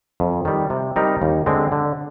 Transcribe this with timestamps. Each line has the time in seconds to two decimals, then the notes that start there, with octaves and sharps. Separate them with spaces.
0.20 F2
0.45 D#3 G3
0.70 C3
0.96 G3 C4 D#4 A#4
1.22 D#2
1.46 D3 G#3 C4
1.72 D3